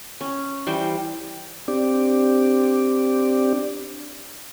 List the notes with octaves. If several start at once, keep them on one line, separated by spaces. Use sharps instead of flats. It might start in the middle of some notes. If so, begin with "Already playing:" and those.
C#4
E3 G3 C5
C4 D4 G4 D5